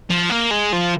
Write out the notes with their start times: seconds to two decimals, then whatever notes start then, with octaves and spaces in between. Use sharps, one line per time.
0.10 F3
0.30 A#3
0.51 G#3
0.72 F3